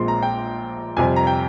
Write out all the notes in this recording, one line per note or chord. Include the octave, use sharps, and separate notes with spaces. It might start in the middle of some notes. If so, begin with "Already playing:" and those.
Already playing: A#1 A#2 G#3 C4 C6
A#5
G5
F2 C3 G3 C4 G#5
A#5
G5